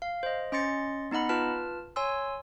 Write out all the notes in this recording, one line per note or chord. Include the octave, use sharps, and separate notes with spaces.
F5
C5 D#5
C#4 D#5 C6 A6 C#7
B3 D#4 D#5 F#5 B5
F4 B4 A5 F6
C#5 G#5 C6 E6